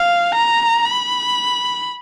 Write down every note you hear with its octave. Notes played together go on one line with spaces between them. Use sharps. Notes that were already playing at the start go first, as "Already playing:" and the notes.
Already playing: F5
A#5
B5